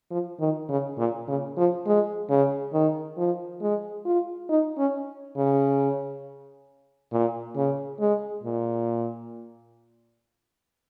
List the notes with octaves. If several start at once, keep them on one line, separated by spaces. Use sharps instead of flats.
F3
D#3
C#3
A#2
C#3
F3
G#3
C#3
D#3
F3
G#3
F4
D#4
C#4
C#3
A#2
C#3
G#3
A#2